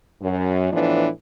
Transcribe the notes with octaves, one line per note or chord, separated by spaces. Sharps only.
F#2
A2 E3 F3 B3 D4